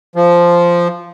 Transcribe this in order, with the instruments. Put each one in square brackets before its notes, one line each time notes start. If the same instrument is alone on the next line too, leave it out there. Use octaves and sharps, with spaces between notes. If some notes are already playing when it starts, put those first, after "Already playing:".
[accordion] F3